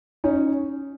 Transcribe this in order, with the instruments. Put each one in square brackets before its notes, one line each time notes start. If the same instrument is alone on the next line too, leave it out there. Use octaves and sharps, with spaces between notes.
[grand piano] C#4 D#4